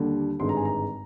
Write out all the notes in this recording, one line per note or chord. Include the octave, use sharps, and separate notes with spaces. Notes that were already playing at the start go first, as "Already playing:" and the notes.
Already playing: D#2 D3 G3 D4
G#1 G2 D3 G#3 D#4 C6
A#5
G#5
A#5